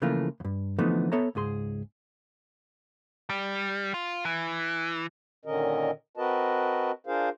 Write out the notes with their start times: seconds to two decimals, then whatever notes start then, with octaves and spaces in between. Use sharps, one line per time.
0.02 C#3 E3 F3 A3 A#3 F4
0.40 E2 G2
0.79 D3 E3 F3 A3 B3 D#4
1.12 B3 A4 C#5 E5 A#5
1.35 C#2 G#2 G#4 C6
3.29 G3
3.94 F4
4.25 E3
5.45 A#2 D3 D#3 C#4 A#4 D#5
6.17 C4 F#4 A#4 B4 D#5 A5
7.07 D4 F4 G#4 A#4 C5 F5